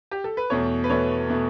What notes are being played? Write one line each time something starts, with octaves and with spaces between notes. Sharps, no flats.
G4
A4
B4
E2 B2 A3 C#5
B4
E2 B2 A3 C#5
B2 A3